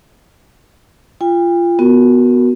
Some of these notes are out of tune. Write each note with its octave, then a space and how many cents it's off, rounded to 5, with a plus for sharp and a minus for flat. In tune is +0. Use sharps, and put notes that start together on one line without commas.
F4 -20 G5 +40
B3 +0 F#4 +0 A#4 +0